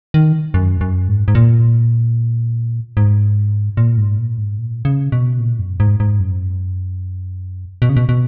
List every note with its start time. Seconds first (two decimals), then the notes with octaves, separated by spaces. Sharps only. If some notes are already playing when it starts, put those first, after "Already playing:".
0.14 D#3
0.54 F#2
0.81 F#2
1.08 G#2
1.28 G#2
1.35 A#2
2.97 G#2
3.77 A#2
3.98 G#2
4.18 A#2
4.38 G#2
4.58 A#2
4.85 C#3
5.12 B2
5.39 A#2
5.59 F#2
5.80 G#2
6.00 G#2
6.20 F#2
7.82 B2
7.89 C#3
7.97 B2
8.09 B2